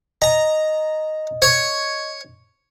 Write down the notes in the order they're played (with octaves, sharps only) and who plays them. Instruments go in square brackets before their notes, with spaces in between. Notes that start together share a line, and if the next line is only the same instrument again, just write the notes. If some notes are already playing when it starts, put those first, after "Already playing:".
[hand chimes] D#5 [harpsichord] A#5
[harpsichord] C#5